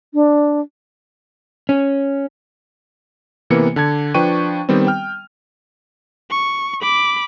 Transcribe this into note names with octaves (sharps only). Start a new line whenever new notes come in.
D4
C#4
C3 E3 A#3 B3 C#7
D3 A5 G#6
F3 D4 B4 G5 C#6 D#7
D#3 G3 B3 C4
G5 F6
C#6
B5 D6